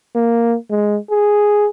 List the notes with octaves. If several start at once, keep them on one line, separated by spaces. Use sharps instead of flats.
A#3
G#3
G#4